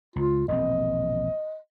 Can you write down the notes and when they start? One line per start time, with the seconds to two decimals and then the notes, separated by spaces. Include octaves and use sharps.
0.16 C#2 F4
0.48 E1 A#1 C4 D#5